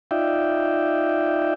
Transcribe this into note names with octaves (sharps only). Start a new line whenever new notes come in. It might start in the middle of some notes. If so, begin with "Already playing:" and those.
D#4 F4 D5 E5 G5